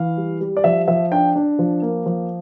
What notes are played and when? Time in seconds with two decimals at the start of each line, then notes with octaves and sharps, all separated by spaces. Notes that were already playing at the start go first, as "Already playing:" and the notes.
Already playing: E3 F5
0.17 G3
0.41 G3
0.57 D5
0.64 F3 E5
0.88 F3 E5
1.12 D4 G5
1.36 D4
1.59 F3
1.82 A#3
2.06 F3